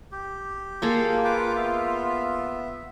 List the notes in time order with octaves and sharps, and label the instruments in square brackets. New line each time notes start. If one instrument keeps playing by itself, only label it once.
[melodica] G4
[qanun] A#3 G#4 A4 [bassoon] F4
[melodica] B4 G5 D6
B3 E5